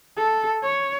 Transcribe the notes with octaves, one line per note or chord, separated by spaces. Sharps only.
A4
C#5